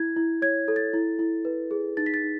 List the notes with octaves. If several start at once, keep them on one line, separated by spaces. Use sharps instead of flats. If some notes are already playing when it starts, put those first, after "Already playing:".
Already playing: E4 G#6
E4
C#5 G#6
A4
A6
E4
E4
B4
G#4
D#4 A6
B6
A6
D#4